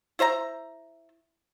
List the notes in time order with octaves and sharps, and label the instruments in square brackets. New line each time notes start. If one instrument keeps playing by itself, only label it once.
[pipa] E4 C5 E5 A#5